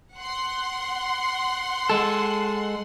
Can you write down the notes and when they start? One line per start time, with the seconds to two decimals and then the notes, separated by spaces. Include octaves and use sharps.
0.15 F#5 C6
1.90 G#3 A4